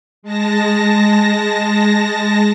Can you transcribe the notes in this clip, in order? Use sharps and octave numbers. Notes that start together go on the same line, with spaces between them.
G#3 A5 A#6